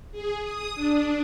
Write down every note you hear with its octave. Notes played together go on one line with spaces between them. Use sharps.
G#4
D#6
D4